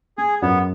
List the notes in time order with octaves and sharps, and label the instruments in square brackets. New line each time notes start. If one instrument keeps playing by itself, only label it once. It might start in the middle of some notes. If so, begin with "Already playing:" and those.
[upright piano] G#3 [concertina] G#4
[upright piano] F#2 [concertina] B3